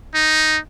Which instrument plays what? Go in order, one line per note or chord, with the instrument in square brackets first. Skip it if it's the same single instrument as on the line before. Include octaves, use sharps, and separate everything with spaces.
[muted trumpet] D#4